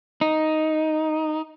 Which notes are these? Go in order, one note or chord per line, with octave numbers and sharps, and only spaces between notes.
D#4